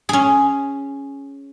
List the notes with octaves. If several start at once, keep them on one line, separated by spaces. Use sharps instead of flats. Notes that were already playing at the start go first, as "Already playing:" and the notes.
C#4 G#4